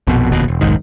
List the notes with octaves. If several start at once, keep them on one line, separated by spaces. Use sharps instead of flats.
A#1 F2 B2
F1 D#2 B2
E1
F1 B1 G#2 D#3